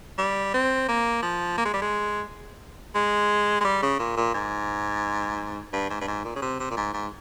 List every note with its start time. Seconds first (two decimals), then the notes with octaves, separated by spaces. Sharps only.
0.19 G3
0.54 C4
0.89 A#3
1.23 F3
1.58 A#3
1.65 G#3
1.74 G3
1.82 G#3
2.95 G#3
3.61 G#3
3.65 G3
3.83 C#3
3.99 A#2
4.17 A#2
4.35 G#2
5.73 G2
5.90 G#2
6.01 G2
6.08 G#2
6.25 A#2
6.36 C#3
6.42 C3
6.60 C3
6.71 A#2
6.77 G#2
6.94 G#2